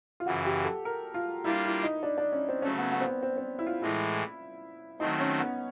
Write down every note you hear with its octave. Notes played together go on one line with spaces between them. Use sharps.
F4
F#2 C#3 E3 F#4
G4
A4
A#4
F4
G3 A#3 D4 E4 F4
E4
D#4
D4
D4
C#4
C4
C#3 F#3 A3 C#4
B3
B3
C4
B3
C4
C4
E4
F4
A2 E3 G#3 E4
D#3 F#3 A3 C4 D#4
C#4
B3